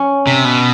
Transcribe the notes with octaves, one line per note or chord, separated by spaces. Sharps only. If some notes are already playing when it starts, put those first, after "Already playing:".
Already playing: C#4
C3
B2